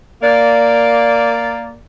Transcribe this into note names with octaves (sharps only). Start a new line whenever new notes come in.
A#3 D5